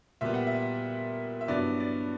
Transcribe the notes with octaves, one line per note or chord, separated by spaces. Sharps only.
A#2 G3 B3 E5
F#5
E5
E5
G2 F#3 B3 E4 D5
D5